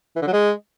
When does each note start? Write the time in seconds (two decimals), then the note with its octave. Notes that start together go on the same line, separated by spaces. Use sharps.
0.16 E3
0.22 D3
0.27 F#3
0.33 G#3